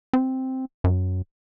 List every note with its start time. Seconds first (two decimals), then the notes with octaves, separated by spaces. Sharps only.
0.13 C4
0.84 F#2